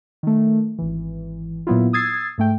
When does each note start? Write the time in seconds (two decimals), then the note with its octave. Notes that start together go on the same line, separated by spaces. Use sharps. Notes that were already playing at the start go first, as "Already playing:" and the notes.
0.23 D#3 A3
0.79 G#1 E3
1.67 A#2 F#3 B3 E4 F4
1.93 D#6 E6 G#6 A6 C7
2.38 G#2 A3 G5